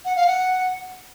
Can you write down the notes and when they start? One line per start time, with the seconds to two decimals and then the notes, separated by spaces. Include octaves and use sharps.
0.05 F#5
0.16 F5
0.27 F#5